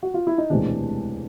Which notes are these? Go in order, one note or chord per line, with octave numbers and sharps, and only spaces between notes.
F#4
F4
E4
D#4
E1 D2 C3 E3 G#3 D4